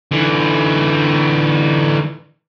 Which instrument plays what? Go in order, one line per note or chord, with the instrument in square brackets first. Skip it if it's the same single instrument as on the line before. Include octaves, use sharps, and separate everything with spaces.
[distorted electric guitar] D3 E3